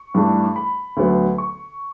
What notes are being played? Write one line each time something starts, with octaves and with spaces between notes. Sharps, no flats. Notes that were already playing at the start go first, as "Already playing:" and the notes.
Already playing: C#6
G2 E3 A3 D4
B5
D2 D3 F#3 B3
C#6